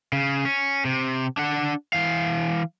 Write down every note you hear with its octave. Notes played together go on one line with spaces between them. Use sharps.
C#3
C#4
C3
D4 F#5
E3 F5